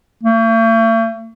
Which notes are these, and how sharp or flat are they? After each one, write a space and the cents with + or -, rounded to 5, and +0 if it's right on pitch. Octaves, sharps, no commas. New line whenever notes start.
A3 +45